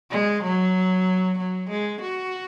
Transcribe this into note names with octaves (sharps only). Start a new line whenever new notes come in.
G#3
F#3
F#3
G#3
F#4